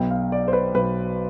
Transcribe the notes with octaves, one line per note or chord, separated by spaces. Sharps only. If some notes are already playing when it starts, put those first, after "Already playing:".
Already playing: B1 B2 B3 G5
F5
D5
C5
B4
B1 B2 B3 B4